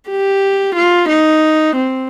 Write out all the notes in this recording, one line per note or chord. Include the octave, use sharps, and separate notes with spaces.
G4
F4
D#4
C4